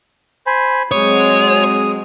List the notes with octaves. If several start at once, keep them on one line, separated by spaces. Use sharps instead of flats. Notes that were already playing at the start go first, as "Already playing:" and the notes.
C5 G#5 B5
F#3 G#3 C4 C#5 D#6